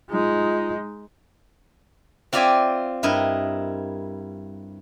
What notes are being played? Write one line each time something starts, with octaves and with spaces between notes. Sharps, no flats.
G#3 D#4 F4
C4 F4 C5 D5 E5 G#5
G2 E4 A#4 D#5